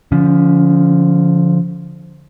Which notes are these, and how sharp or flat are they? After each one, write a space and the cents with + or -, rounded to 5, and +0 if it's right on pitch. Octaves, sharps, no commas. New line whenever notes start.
D3 -15 F3 +0 C#4 +25